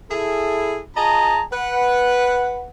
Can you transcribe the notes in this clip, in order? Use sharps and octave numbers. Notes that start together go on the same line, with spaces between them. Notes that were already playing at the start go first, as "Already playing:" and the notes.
E4 G#4 A4
F4 G#4 D#5 A5 A#5
B4 F#5